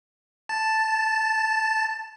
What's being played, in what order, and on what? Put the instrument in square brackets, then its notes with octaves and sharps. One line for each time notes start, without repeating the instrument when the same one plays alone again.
[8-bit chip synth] A5 A6